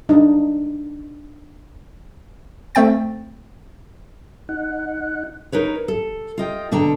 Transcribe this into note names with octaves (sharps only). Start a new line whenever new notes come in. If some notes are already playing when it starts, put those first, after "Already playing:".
D4 D#4 D#5
A3 C4 G5 A6
D#4 F#5
D#4 A#4 B4 C#5
A4
F4 D#5 G5
B2 D3 D4 A4 G5 A#5